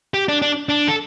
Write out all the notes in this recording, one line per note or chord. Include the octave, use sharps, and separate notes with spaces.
G4
D4
D4
D4
A4